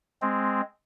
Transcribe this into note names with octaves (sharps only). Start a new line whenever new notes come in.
G#3 C4